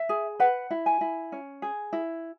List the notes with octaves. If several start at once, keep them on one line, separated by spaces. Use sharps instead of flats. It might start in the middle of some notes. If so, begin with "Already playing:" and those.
Already playing: E5
G#4
B4 F#5
E4
G#5
E4
C#4
G#4
E4